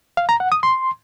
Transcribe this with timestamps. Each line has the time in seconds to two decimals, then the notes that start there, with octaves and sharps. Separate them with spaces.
0.17 F5
0.29 A#5
0.40 F#5
0.52 D#6
0.63 C6